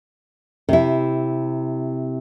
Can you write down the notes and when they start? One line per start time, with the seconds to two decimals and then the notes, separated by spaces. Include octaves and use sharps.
0.69 C3 E4